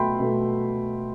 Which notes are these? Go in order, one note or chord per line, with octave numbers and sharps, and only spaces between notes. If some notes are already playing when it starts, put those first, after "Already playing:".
Already playing: B2 A3 E5 G5 B5 C6
B2 A3